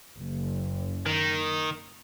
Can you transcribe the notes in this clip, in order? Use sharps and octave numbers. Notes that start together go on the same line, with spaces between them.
F#1
D#3